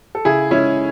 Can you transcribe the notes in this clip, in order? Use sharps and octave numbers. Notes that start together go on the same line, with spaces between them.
A4
C#3 E4 G#4
G#3 C#4 E4